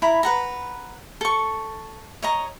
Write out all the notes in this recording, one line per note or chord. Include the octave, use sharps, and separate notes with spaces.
E4 A#5 B5
B4 F#5 A#5
A4 C#6
C#5 D#5 A#5